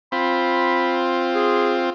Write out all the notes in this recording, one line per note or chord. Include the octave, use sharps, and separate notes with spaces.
C4 F4 B5
G#4